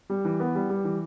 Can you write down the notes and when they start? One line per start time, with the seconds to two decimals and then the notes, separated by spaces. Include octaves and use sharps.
0.10 G3
0.25 E3
0.40 B3
0.55 G3
0.69 G3
0.84 E3